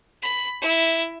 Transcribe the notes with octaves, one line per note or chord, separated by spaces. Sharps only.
B5
E4